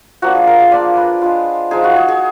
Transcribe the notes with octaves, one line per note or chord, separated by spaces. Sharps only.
F3 A#3 D4 F#4
G#4
A#4
G#4
A#3 D4 F4 D5
B4
G#3 D4 F4
F3 G#3 D#4 G#4
F#4
G#4
G#4